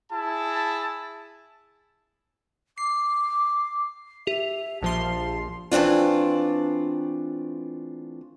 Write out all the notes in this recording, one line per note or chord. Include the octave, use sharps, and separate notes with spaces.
E4 G#4 A5
D6 C7
G4 E5 F7
A#1 F3 A5 C6
E3 A3 C4 D4 F4